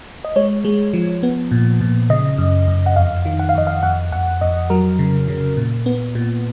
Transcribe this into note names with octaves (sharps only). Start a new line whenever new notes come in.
D#5
G#3 C#5
G#3
F3
B3
A#2
A#2
C#3 D#5
F#2
F#2
F#5
F2 F5
D#3
F#5
F5
F2 D#5
F5
F2 F#5
F2 F#5
F2 D#5
F#3 A#4
C#3
C#3
A#2
B3
A#2